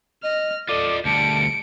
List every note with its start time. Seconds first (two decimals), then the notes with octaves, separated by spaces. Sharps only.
0.23 D#5 F6
0.69 F4 A4 D5 D#5 D6
1.05 D2 G3 A5 C#7 D7